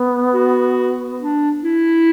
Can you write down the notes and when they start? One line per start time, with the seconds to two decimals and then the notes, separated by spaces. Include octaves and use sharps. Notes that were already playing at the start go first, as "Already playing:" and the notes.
Already playing: B3
0.34 F#4
1.20 D4
1.63 E4